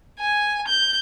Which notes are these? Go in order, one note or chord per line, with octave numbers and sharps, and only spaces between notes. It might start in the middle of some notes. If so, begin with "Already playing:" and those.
G#5
G6